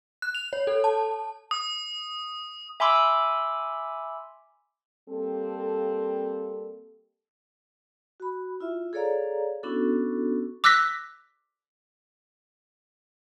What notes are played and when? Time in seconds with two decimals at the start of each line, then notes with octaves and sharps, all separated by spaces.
0.22 F#6
0.35 F7
0.53 C#5
0.67 A4
0.84 A5
1.51 D#6
2.80 E5 G#5 B5 C6 D6 E6
5.09 G3 A#3 C4 A4
8.20 F#4 B5
8.60 E4 F4 E5
8.93 G#4 A4 C#5 D5 F5 A#5
9.63 B3 C#4 D4 E4 F#4 A4
10.64 D6 E6 F#6 A#6 B6